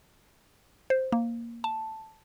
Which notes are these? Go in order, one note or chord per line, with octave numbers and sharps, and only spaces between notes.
C5
A#3
A5